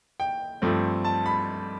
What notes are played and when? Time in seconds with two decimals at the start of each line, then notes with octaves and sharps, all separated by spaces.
0.20 G5
0.62 G2 F3 A3 C4
1.04 A5
1.26 B5